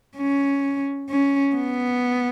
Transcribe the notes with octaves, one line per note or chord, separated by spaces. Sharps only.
C#4
C#4
B3